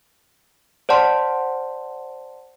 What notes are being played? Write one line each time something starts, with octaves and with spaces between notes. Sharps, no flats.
C5 D5 F#5 A5 C6